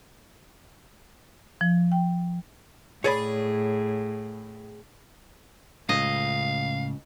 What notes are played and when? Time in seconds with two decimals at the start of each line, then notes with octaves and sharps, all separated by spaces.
1.61 F3
1.92 G5
3.04 A2 G#4 C#5 D5 B5
5.89 C#2 A2 C#3 D#5 F5